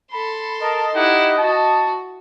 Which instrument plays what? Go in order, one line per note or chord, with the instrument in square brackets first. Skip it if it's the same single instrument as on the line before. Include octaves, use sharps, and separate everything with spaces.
[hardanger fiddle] A4 C6 [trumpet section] B5
[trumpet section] A#4 A5 [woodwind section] D#5
[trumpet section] D#4 G4 F#5 [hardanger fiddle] E4
[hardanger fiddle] F#4 [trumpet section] A5